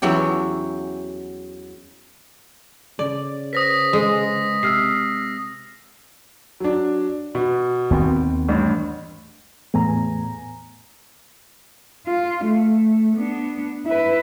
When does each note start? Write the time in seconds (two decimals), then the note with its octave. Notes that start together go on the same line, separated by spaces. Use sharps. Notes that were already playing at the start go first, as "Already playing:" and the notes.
0.02 E2 E3 F#3 C#4 G4
2.99 C#3 D5
3.53 B4 C5 D#6 A#6 B6
3.93 G#3
4.63 C3 E6 F6 C7
6.60 F#3 D4
7.35 B2
7.91 D#2 B3 C4
8.48 A1 G2
9.74 E2 A2 B3 G#5 A#5
12.07 F4
12.45 A3
13.17 B3 D4
13.86 E4 B4